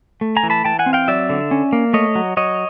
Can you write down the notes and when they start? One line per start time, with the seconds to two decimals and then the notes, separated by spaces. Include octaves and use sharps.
0.21 A3
0.36 G#5 A#5
0.43 E3
0.50 A5 B5
0.64 E3 G5 A5
0.79 F#5 G#5
0.86 C4
0.93 F5 G5
1.08 F#3 D5 E5
1.30 D3
1.51 C#4
1.73 A#3
1.93 A3 C#5 D#5
2.15 F#3
2.37 F#3 C#5 D#5